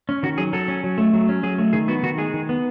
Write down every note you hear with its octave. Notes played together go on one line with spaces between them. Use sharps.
C#4
D#3 F#4
F#3 G#4
F#3 A4
C#4
F#3
A3
F#3
C#4
F#3 G#4
A3
D#3 G#4
B3 F#4
D#3 F#4
G#3 G#4
D#3
B3